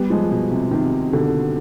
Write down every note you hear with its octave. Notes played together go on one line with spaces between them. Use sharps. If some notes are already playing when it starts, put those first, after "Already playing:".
Already playing: G3 B3
F3 G#3
B2
C3
C3 D#3
B2 D3